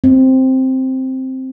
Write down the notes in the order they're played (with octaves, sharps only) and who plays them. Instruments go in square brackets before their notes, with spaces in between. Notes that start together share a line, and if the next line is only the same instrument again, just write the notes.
[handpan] C4